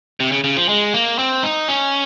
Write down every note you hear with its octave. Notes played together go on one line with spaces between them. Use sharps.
C3
C#3
C#3
F3
G#3
A#3
C4
D#4
C#4